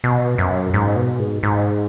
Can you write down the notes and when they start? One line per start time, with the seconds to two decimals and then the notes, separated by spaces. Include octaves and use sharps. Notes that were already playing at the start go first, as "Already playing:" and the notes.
0.04 B2
0.38 F#2
0.74 G#2
0.96 B2
1.20 G#2
1.43 G#2